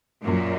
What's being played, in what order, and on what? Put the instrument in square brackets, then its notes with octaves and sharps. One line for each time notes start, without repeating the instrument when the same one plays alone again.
[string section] F#2 A#2